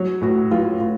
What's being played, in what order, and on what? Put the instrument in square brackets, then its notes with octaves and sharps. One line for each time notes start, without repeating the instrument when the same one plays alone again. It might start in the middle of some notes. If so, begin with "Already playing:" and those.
Already playing: [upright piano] F#3 C#5
A2 F#4
F#3 F4
A2 F4